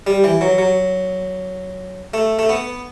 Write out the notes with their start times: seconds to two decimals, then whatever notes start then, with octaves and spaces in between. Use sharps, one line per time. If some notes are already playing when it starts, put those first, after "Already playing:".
0.07 G3
0.24 E3
0.41 F#3
0.58 F#3
2.14 A3
2.39 A3
2.49 B3